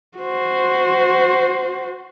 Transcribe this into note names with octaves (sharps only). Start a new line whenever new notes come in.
F#4 C5